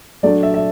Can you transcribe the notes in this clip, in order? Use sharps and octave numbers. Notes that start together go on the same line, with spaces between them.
F#3 A3 D4 D5
E5
E5